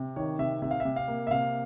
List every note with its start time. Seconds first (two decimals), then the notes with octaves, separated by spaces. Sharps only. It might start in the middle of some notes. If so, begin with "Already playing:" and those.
Already playing: C3
0.16 D#3 C#5
0.39 C3 E5
0.62 C3 E5
0.71 F5
0.80 C3 E5
0.96 F5
1.08 A#3
1.27 E5
1.31 C3 F5